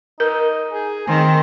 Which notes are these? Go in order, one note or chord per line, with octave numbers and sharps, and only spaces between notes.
D#4 A#4
G#4
D#3 C4